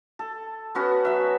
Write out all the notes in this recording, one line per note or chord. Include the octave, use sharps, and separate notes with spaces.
A4
B3 C#4 F#4 B4
F#3 E5